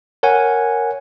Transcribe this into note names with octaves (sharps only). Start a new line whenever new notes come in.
A#4 C#5 F#5 G#5